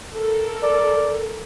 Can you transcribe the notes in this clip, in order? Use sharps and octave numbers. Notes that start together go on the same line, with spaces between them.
A4 A#4
D5